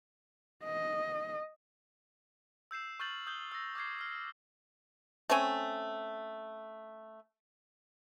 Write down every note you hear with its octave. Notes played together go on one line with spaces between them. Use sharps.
D#5
E6 G6 C7 E7
C#6 F6 G6 A6 F#7
D#6 G6 G7
E6 A#6
D6 F6 G#6 C7
F6 C7
A3 C4 C#4 G#5